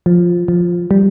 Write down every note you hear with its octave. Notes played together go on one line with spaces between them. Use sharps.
F3
F3
G3